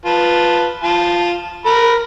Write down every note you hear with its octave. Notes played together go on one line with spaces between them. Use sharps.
F4 B4 A5
F4 A5
A#4 B5